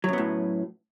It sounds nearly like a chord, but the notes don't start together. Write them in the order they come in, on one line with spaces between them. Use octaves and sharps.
F#3 F#2 B3 A2